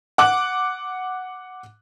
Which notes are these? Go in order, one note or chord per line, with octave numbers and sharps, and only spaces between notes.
F#5 D6 F#6 F#7